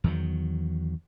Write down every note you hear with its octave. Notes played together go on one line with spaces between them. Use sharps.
E2 D#3 F#3